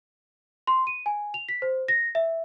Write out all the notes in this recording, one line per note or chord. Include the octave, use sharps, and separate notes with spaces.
C6
D#7
G#5
F7
B6
C5
A#6
E5